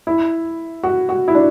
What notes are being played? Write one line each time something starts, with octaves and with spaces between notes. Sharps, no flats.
E4
F#4
F#4
E4
D4